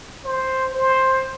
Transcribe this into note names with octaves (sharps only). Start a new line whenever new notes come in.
C5
C5